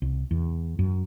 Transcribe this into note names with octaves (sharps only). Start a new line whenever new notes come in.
C2
E2
F#2